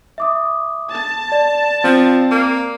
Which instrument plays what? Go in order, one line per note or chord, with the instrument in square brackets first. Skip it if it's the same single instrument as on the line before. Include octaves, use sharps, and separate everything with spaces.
[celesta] E5 D6 D#6
[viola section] A5
[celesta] D5
[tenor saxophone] F3 [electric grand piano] C4
[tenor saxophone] A#3